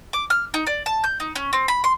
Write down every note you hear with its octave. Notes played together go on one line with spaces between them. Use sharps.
D6
F6
D#4
D5
A5
G6
D#4
C#4
C4
B5
C6